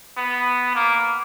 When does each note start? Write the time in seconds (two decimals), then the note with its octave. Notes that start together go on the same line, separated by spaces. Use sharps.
0.17 B3
0.75 A#3